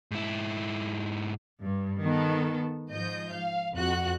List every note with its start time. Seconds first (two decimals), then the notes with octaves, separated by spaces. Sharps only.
0.11 G#2 E4
1.61 G2
2.02 D#3 B3 A4
2.90 G#2 F3 D#5 G6
3.33 F5
3.74 F2 F#4 F#6